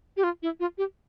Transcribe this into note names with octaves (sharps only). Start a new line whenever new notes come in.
G4
F4
E4
F4
G4